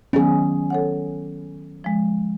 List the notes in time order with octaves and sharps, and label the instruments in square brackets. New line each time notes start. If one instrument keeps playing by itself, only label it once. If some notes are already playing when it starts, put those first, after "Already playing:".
[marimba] D#3 F#3 B3 [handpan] C#4 G#4
[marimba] A4 C#5 F#5
F3 G#3